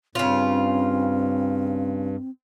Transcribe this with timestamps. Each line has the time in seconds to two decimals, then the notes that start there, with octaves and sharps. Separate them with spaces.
0.15 G2 C#3 C4 F4